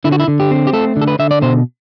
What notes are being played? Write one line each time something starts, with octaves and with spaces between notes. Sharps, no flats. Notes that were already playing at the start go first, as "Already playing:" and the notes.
D3 E4
F#4
E4
D3
G4
C4
G4
A3 A4
D3
A4
B4
D3 E5
D5
B2 C5